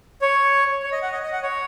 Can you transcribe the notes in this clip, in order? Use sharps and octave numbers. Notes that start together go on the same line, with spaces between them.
C#5
C#5
D#5
F#5
D#5
D#5
F#5
C#5